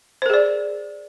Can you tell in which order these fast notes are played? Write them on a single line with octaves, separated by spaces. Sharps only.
C5 A#4 G#4 D5